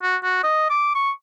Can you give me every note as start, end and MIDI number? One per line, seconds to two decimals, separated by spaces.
0.03 0.16 66
0.23 0.39 66
0.44 0.68 75
0.70 0.93 86
0.95 1.11 85